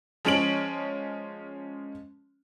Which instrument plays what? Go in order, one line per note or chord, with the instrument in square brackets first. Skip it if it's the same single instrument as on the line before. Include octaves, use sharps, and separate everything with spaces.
[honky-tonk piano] F3 G#3 C#4 C#5 D7 F#7